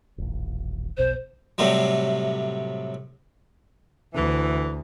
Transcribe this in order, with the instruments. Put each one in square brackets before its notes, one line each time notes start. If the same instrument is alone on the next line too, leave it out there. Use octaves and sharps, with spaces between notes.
[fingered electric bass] D#1 A1
[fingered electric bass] F1 B1 B2 [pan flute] C5
[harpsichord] A2 C3 F#3 G3
[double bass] D2 [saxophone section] D3 E3